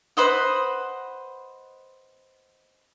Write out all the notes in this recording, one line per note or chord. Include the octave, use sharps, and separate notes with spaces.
B4 C5 D#5 F#5